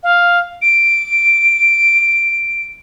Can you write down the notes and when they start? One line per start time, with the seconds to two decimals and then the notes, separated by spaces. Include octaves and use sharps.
0.03 F5
0.62 D7